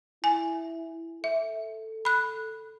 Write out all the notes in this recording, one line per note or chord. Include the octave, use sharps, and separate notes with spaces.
E4 G#5
A4 E5
B5 F#6